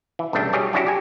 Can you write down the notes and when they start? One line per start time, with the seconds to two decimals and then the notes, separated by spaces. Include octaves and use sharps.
0.19 E3
0.33 B1 G2 C#3 A3 D4 G5
0.53 F#3 G3 G4 G#4 C#5
0.73 F#3 C#4 D4 E4 F#4 G4
0.87 G4 G#5